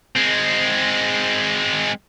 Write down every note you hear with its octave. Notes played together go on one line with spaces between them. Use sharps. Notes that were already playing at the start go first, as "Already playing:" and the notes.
G#3 C4